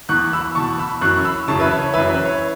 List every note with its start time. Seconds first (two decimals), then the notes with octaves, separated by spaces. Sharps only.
0.09 E2 E3 C#6 F#6
0.33 B5 E6
0.55 E2 B2 A5 C#6
0.79 B5 E6
1.01 F#2 E3 C#6 F#6
1.24 B5 E6
1.48 F#2 C#3 E3 A5 C#6
1.60 B4 E5
1.71 C#5
1.82 C#5
1.94 F#2 E3 B4 E5
2.10 B4
2.25 C#5